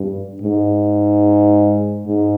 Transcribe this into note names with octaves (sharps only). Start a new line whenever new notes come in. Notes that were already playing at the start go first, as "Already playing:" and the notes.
Already playing: G2
G#2
G#2